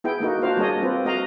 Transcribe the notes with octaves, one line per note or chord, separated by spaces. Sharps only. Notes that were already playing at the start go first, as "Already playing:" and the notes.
B3 E4 G#4 G5
A3 A#3 D#4 F#4
D4 F4 F#4 C5 F5
G3 A#3 D4 G#4 C#5 D#5
C4 F4 G4 B4
A3 F#4 D#5 F5 A#5